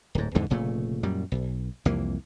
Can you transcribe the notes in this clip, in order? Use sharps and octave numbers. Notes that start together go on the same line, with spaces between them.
D1 G#2
E2 G#2 D3 E3
F1 A#2 C#3 A3
F#2 A#2 G3
B1
C2 F2 E3 A#3